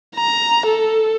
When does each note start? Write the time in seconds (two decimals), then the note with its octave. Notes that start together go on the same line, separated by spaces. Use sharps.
0.16 A#5
0.66 A4